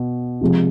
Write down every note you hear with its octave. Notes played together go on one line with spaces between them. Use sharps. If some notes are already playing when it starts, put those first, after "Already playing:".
Already playing: B2
C3 F3 G#3